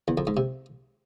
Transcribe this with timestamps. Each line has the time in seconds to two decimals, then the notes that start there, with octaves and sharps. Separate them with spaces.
0.08 E2
0.18 F2
0.27 G#2
0.37 C3